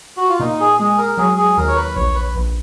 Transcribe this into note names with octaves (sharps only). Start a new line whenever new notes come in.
F#4
F4
A#2 D#4
G#4
G#3 G#4
A#4
F#3 G#4
G#4
D#2 A#4
C#5
B4
A#1 C#5
B4
A#1